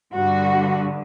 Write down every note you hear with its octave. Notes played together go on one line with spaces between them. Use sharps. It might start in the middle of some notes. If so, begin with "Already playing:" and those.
G2 D3 F#4